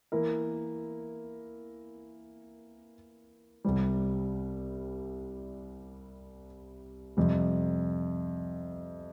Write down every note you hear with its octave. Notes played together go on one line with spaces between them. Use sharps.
E3 A#3 E4 A#4
C2 C3 G3
F2 C3 G3